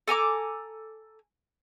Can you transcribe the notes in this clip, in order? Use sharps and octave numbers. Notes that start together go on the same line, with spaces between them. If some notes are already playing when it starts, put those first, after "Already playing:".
A4 G#5 A#5 D6